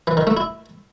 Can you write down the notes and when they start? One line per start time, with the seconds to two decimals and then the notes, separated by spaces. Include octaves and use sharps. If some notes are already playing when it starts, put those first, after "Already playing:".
0.07 E3
0.17 D#3
0.27 A3
0.37 E4